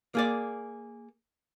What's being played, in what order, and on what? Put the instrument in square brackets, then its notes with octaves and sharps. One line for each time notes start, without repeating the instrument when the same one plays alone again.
[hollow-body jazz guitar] A#3 G#4 D5